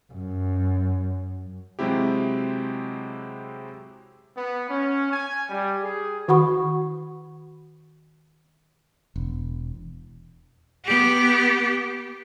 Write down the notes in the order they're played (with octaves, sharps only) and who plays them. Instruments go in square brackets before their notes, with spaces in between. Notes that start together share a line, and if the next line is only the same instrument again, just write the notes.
[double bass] F#2
[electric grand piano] C3 F#3 G#3 C4 E4 G4
[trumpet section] B3
C#4
G#5
G3
G#4
[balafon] D#3 F#4 F#5 B5 C#6
[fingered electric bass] E1
[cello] B3 G4